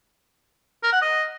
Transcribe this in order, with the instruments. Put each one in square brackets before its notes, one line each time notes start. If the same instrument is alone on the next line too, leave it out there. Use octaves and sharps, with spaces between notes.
[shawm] A#4
F#5
D#5